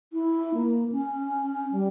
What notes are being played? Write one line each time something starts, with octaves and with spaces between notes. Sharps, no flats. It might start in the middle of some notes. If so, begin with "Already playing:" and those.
E4
A#3
C#4
G3